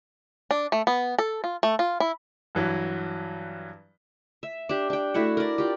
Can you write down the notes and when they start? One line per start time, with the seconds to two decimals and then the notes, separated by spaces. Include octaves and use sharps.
0.51 D4
0.72 A3
0.87 B3
1.19 A4
1.44 F4
1.63 A3
1.79 F4
2.00 E4
2.55 G2 E3 F#3
4.43 E5
4.69 D4 G4
4.90 D4 G5
5.14 A3 E4 F#4 F#5
5.37 A#4 D5
5.58 F4 G4